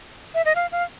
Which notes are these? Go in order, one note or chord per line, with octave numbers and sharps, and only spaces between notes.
E5
D#5
F5
F5